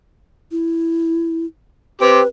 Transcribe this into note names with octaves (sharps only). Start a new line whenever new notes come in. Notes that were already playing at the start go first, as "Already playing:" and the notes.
E4
C4 G4 B4